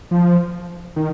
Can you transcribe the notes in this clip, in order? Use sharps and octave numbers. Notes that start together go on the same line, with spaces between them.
F3
D#3